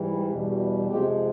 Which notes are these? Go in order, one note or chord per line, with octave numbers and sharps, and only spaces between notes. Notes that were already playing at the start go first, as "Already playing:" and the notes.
Already playing: G#2 E3 G3
E2 B2 G3
F2 C3 F3 G#3 G4